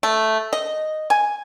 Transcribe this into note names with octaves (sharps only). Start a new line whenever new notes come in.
A3
D#5
G#5